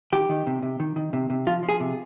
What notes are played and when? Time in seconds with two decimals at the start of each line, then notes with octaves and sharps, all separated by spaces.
0.12 D#3 G4
0.29 D#3
0.47 C3
0.63 C3
0.80 D#3
0.96 D#3
1.13 C3
1.30 C3
1.47 F3 F4
1.63 F3
1.69 G#4
1.80 C3